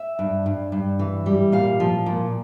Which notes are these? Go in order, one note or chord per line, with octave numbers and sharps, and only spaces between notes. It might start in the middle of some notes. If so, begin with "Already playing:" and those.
Already playing: E5
G2
G2
G2
E3
G3
A#2 F5
F3
A#2